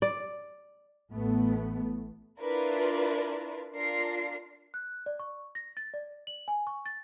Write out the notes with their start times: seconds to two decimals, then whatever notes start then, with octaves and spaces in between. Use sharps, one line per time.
0.02 D5
1.12 A1 A3 B3
2.40 D4 E4 F4 A#4 B4
3.75 D4 F4 A#4 C7
4.74 F#6
5.06 D5
5.20 C#6
5.55 A#6
5.77 A6
5.94 D5
6.27 F#7
6.48 G#5
6.67 C#6
6.86 A6